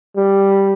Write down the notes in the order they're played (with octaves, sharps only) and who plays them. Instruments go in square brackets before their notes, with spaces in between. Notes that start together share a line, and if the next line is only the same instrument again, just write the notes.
[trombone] G3